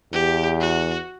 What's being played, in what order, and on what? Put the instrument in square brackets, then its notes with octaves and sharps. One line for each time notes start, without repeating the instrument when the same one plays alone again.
[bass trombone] E2 [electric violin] G4
[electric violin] F#4